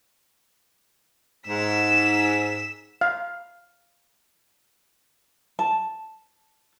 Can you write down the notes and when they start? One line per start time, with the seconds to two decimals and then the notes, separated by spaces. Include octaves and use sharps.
1.48 G#2 E6 B6
3.01 F5
5.59 A5